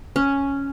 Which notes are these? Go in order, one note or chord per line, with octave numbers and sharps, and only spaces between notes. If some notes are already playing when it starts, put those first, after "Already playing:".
C#4